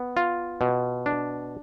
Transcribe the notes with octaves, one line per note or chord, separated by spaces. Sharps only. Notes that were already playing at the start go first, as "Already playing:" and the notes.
Already playing: B3
F4
B2
D4